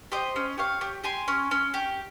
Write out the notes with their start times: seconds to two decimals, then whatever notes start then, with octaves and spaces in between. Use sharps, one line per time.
0.12 G4 C5 D#5
0.36 C#4
0.58 G4 C#5 F5
0.81 G4
1.04 G4 G#5 C6
1.28 C#4
1.51 C#4
1.74 G4